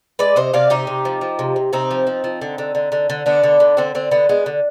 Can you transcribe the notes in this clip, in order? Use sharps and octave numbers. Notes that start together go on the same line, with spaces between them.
G#3 B4 D5
C3 C5 D#5
C3 D5 F5
C3 D#4 G4
C3
F3
F3
C3
C3
C3 C4 D#4
F3
F3
F3
D3
D3
D3
D3
D3
D3 B3 D4
D3
D3
D3 C4
D3 C4
D3 B3
G#3 B3
D3